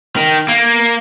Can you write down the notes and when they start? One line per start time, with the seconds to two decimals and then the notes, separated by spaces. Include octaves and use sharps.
0.17 D#3
0.49 A#3